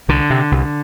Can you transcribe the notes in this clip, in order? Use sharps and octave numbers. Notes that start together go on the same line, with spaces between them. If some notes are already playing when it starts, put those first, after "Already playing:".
C2 D3
C3
C2